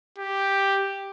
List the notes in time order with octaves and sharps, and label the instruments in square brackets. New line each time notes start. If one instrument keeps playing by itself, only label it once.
[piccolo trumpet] G4